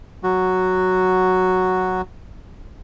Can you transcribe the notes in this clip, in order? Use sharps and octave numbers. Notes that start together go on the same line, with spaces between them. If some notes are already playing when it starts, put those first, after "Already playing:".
F#3 F#4